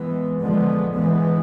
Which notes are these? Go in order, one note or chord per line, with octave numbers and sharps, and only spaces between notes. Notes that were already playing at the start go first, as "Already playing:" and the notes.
Already playing: E3 G#3 B3
D3 F3 G#3 B3
E3 G#3 B3